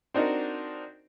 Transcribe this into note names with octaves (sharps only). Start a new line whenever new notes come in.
C4 D4 D#4 F#4 A#4